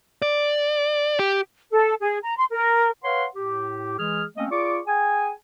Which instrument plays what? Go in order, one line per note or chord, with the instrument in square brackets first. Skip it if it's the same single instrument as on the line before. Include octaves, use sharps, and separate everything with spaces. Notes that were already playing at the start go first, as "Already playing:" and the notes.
[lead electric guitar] D5
G4
[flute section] A4
G#4
A#5
C6
A#4
[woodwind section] B4 C#5 F5 F#5 C6
A2 G4
E3 G#3 G#4 F6
A3 A#3 C4 C#4 D#5
F4 G#4 D5 C#6 D6
G#4 G5 G#5